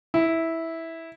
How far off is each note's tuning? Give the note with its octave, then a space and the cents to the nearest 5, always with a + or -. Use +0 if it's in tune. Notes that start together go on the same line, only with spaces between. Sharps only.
E4 -10